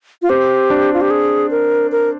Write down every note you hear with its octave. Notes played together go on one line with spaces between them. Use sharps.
F4
C4 G4
D4
F4
G4
G#4
A#4
A#4